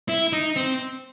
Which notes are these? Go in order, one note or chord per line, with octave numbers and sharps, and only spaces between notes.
E4
D#4
C4